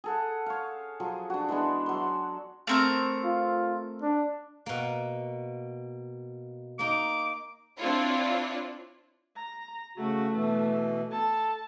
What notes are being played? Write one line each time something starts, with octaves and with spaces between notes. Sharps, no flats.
G#4 A4 F#5
C#5 F5
F3 F#3 G#4
D4 F#4
E3 G#3 B3 D4
F#3 C6
A3 C4 A#4
F4
D4
B2 A#3
A#3 D#4 D6
C4 D4 E4 F4 C#5
A#5
C#3 A3 F#4
B2 E3
A4 A5